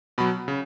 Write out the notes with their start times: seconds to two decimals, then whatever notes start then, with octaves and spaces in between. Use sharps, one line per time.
0.18 B2 F#3 B5
0.48 C#3